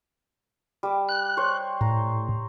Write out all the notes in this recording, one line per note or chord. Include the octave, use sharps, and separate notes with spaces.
G3 D6
F#6
C5 C#5
A2 A#5